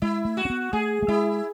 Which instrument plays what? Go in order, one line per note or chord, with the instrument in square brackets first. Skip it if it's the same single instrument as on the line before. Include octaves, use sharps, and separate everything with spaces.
[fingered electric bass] G#3 [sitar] E4
[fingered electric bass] A3
[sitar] F#4
[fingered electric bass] C#4
B3
[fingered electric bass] A3 [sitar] G#4
[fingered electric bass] A3
[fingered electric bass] G#3 [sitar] E4